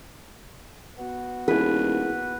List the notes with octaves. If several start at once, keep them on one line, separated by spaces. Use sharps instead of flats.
B3 F#4
D#1 E4 G#4 B4